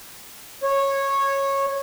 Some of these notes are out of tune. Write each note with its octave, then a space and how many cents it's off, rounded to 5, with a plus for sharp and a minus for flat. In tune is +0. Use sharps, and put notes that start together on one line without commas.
C#5 -15